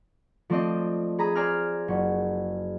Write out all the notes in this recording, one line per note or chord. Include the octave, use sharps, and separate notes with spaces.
F3 A3 C4 C5 D5 D#5
G#4 A#5 B5 D#6
C5 D5 G#5 A#5 F6
F#1 C#6